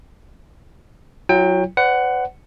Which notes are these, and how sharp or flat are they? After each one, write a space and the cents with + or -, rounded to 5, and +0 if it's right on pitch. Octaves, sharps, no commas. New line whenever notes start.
F#3 +0 E4 +45 G5 +25
B4 +45 D5 -30 F#5 +10